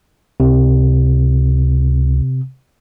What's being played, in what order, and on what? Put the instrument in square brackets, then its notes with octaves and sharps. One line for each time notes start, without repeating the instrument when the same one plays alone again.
[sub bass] C#2 [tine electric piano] C3